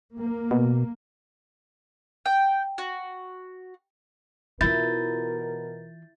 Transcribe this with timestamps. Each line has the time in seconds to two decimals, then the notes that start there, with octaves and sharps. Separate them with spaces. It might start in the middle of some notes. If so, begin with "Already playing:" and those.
0.18 A#3
0.51 B2
2.26 G5
2.78 F#4
4.61 B2 E3 E4 F4 A#4 G6 A6